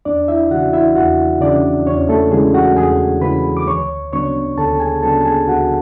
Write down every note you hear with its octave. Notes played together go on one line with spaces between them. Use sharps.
E2 D4 D5
E4 E5
C#3 E3 F#4 F#5
E4 E5
E2 F#4 F#5
C#3 E3 D4 D5
E2 C#4 C#5
A3 A4
C#3 E3 G#3 G#4
F#4 F#5
E2 G#4 G#5
C#3 E3 B4 B5
D6
D2 C#5 C#6
C#3 F#3 B3 D4 C#5 C#6
D2 A4 A5
G#4 G#5
C#3 F#3 B3 D4 A4 A5
A5
G#4 G#5
D2 F#4 F#5